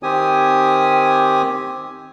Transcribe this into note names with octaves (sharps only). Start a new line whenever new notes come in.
D#3 C4 G4 G#5 D#6